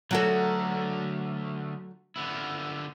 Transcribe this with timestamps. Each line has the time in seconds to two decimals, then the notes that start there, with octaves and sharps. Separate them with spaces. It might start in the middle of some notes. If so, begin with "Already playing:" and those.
0.11 D3 F#3 A3 F#4 A4
2.16 D3 B3 E4